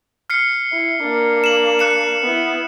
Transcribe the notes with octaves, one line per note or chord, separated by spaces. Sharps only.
F6 C7 C#7
E4
A#3 D4
E7 F#7
F#6 C#7 E7
B3 E4